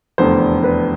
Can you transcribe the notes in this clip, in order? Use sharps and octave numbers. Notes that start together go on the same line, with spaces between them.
F1 E2 D3 C5
B4